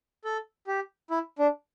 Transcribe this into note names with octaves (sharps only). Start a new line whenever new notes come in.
A4
G4
E4
D4